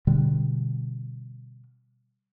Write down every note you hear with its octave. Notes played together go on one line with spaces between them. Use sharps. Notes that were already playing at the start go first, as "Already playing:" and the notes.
B2 D3 G3